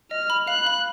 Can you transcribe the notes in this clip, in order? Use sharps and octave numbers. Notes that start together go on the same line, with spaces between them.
D#5 F6
B5
F5 F#6
B5